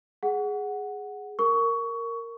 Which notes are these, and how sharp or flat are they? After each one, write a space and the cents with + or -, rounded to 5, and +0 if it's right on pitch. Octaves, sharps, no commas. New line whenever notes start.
G#4 +0 F#5 +0
A#4 -10 C#6 +20